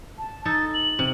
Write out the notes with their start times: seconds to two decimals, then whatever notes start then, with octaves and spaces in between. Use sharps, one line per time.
0.18 A5
0.45 D#4 A4 A6
0.74 F#7
0.99 C3